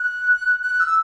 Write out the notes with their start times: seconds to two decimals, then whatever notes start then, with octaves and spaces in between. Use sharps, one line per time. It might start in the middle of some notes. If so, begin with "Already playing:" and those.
Already playing: F#6
0.62 F#6
0.80 E6